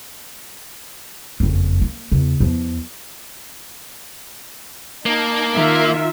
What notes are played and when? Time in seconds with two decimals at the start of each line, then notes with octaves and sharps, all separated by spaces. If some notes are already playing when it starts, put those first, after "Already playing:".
1.40 F#1 F2
1.81 A#3
2.12 E2 C#3
2.40 E2 F3
5.06 A#3 D#4 A5
5.54 D#3 F4 A#4 E5